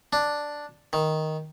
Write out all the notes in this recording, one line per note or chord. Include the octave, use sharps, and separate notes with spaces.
D4
D#3